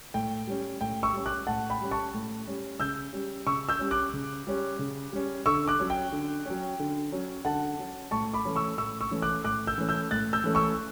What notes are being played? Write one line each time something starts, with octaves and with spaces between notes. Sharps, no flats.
A2 G5
G3 C#4
A2 G5
C#6 E6
G3 C#4
D6 F#6
A2 F#5 A5
G5 B5
G3 C#4
A5 C#6
A2
G3 C#4
C#3 E6 G6
G3 C#4
C#3 C#6 E6
E6 G6
G3 C#4
D6 F#6
C#3
G3 C#4
C#3
G3 C#4
D3 C#6 E6
D6 F#6
F#3 C#4
G5
D3
F#3 C#4
D3
F#3 C#4
D3 F#5 A5
F#3 C#4
A2 A5 C#6
B5 D6
E3 A3 C#4
C#6 E6
A2 C#6 E6
C#6 E6
E3 A3 C#4
D6 F#6
A2 D6 F#6
E6 G6
E3 A3 C#4
E6 G6
A2 F#6 A6
E6 G6
E3 A3 C#4
C#6 E6